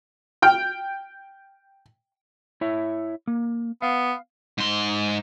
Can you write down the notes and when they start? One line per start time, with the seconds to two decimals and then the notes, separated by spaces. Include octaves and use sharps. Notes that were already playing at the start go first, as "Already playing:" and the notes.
0.42 G5 F6
2.61 E4 C#5 E5
3.27 A#3
3.82 B3 F5
4.58 G#2 C6